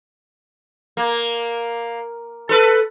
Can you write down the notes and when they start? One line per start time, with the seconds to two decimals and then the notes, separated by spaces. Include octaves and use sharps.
0.97 A#3
2.49 A4 B4